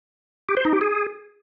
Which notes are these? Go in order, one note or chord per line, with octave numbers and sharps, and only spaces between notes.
G4
C5
D#4
G4
G#4